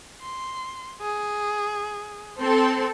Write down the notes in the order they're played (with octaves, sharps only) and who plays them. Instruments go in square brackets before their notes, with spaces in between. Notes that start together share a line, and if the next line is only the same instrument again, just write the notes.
[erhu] C6
G#4
[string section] C4 A4 [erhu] C6